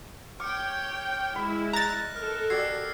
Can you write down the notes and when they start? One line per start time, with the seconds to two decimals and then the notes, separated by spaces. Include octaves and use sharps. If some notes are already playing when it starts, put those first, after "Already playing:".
0.40 C#5 G5 D6 F6 C#7
1.36 G#3 E4 B5
1.73 D#5 A#5 F#6 A6 A#6
2.16 A4 A#4 F6
2.50 F#4 G4 D5 E6 G#6 C7